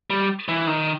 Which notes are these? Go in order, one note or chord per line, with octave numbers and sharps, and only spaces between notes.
G3
E3
D#3